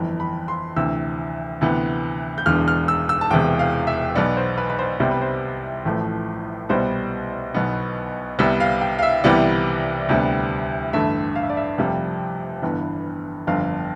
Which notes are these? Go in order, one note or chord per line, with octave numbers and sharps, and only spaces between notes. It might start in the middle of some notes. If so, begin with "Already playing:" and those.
Already playing: G1 F2 E3
B5
C6
D2 C3 E3 E6
D2 C3 E3 B3
G6
E1 E2 D3 F6
F6
E6
E6
A5
E1 E2 C3 G5
F5
E5
B1 B2 B3 D5
C5
B4
B4
C5
C2 C3 G3 B3 C5
B4
C5
A1 A2 F3 A3
C2 B2 G3 B3 C5
B1 B2 B3
C2 C3 G3 B3 E5
F5
G5
F5
E5
C2 C3 E3 G3 B3 D5
D2 C3 G3 B3
A1 G2 D3 A3 E5
F5
E5
D5
E5
F1 F2 C3 G3 F5
G1 G2 E3 B3
G1 F2 D3 F5